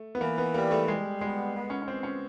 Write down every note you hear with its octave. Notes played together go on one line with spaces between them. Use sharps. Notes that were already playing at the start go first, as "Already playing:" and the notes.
Already playing: A3
B3
E3 A#3
B3
G3 A#3
A3
G3 G#3
G#3 B3
B3
C#4
C#4
B3 C4
C#4